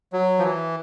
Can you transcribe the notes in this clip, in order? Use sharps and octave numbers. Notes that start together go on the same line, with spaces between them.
F#3
F3
E3